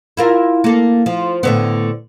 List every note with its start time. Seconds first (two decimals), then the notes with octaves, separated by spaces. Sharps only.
0.17 E4 F4 A#4
0.64 A#3 A4
1.06 F3
1.43 A2 D3 B3